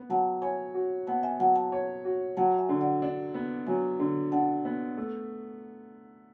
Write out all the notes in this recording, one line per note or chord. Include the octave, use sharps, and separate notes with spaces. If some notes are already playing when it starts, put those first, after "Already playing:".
Already playing: B3
F#3 F#5 A5
C#5 G#5 B5
F#4
B3 F#5 A5
E5 G#5
F#3 F#5 A5
F#5 A5
C#5
F#4
F#3 F#5 A5
E5 G#5
D3
D5 F#5
D4
B3
F#3 E5 G#5
D3
D4 F#5 A5
B3
A3